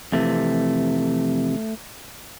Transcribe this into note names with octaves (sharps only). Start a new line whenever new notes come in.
F2 C3 E3 A3